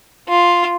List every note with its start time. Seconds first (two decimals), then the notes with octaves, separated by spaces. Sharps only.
0.29 F4